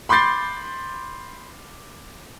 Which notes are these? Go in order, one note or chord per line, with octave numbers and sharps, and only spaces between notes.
B5 C6 D6 G6 A6 C7